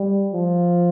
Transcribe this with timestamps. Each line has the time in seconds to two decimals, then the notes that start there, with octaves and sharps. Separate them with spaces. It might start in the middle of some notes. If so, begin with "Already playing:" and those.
Already playing: G3
0.33 F3